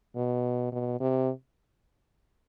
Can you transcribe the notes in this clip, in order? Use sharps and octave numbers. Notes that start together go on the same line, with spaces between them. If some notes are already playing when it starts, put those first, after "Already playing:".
B2
B2
C3